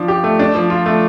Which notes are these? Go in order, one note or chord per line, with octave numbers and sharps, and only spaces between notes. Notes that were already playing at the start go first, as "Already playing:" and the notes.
Already playing: F3 D4
G4
A3
D4
F3
F4
A3